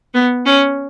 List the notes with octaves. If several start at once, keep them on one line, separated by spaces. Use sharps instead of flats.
B3
C#4